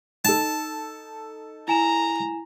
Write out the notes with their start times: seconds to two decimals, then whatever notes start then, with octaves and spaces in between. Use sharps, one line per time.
0.25 D#4 A4 A5
1.68 E4 G#5 A#5 E7